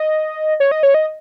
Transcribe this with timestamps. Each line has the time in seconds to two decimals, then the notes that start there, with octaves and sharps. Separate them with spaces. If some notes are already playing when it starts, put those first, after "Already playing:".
Already playing: D#5
0.60 C#5
0.71 D#5
0.83 C#5
0.94 D#5